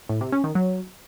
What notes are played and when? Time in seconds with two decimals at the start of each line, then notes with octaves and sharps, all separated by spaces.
0.09 A2
0.21 C3
0.32 C#4
0.44 D#3
0.55 F#3